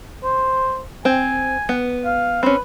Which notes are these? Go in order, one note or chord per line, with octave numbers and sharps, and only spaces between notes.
C5
C4 G#5
B3
F5
C4 C#4 B4